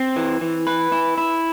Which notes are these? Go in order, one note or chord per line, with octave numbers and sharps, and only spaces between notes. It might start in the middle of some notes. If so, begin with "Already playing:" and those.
Already playing: C4
E3
E3
B4
E4
E4